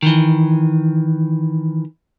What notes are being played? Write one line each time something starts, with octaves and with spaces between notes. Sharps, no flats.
D#3 E3